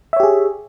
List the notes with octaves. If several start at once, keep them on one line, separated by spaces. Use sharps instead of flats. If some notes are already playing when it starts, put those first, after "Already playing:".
G4 G#4 C#5 E5